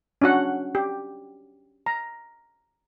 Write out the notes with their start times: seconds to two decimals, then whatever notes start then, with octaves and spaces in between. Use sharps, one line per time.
0.21 C#4 D4 F#4 F#5
0.75 G4
1.86 A#5